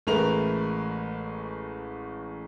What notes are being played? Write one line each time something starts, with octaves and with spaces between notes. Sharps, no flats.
A1 G#3 A3 A#4 B4 F7